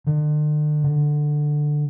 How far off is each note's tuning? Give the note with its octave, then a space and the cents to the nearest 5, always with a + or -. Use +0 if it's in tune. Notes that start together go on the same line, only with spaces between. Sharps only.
D3 +40
D3 +10